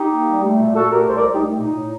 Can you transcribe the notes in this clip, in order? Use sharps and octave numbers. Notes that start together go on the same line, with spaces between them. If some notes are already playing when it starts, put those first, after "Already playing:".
Already playing: D#4 G4
A#3
G3
A3
A#2
A#2 F#4 A4
A3 G4 A#4
C2 A4 C5
A#4 D5
C2
D#4 G4
A3
A#2 D#4
A2